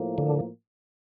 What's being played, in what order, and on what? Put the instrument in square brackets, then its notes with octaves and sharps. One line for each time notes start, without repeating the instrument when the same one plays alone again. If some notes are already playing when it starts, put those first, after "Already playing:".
Already playing: [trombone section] A2 F3 A#3
[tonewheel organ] D3